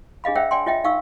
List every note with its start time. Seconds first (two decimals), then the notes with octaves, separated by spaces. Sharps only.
0.24 D4 G#4 D#5 F5 B5
0.35 C5 C#5 E5 F#5 G5 E6
0.51 D5 G5 G#5 C6
0.66 F4 C#5 D#5 E5 G5
0.84 D#4 F5 C#6 E6